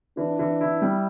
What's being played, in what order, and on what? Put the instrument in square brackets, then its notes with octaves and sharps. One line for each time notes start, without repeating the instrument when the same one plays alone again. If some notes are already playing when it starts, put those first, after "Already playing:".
[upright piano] E3 [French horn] D4
[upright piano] E3
E4
G3